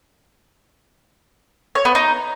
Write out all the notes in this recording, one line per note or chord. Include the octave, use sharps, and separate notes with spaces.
C#5
B3
D#4